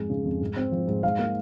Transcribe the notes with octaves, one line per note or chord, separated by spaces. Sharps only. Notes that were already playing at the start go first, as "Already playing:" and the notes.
Already playing: F2 G#2 G#3
C#3
F2
G#2
C4
F3
G#2
G#2 F5
A#3